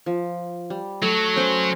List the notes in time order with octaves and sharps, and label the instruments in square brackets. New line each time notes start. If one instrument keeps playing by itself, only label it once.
[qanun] F3
G3
[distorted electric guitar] F#3 [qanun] A3
[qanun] C#4 C5 F#5